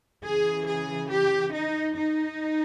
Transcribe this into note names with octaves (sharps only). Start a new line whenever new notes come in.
C#3 E3 G#4
G#4
G4
D#4
D#4